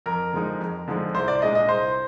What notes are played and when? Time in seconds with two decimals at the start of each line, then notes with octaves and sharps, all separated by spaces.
0.06 F2 A#4
0.33 D3 F3 G#3 D#4
0.60 F2
0.88 D3 F3 G#3 D#4
1.15 C2 C5
1.28 D5
1.42 A#2 G#3 D4 D#5
1.55 D#5
1.69 C2 C5